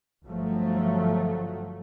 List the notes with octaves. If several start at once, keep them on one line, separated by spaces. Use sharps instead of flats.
G1 F3 F#3 A3